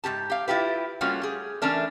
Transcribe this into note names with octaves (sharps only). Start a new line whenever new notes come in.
G#2 C3 G4 A5
G4 F5
E4 F4 G4 B4
G3 A3 A#3 C#4 F4 F#4
G4 G#4
E3 A3 C#4 D4 A#4